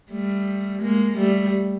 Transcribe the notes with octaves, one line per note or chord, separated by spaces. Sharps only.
G3 A3
G#3 A#3
G3 A3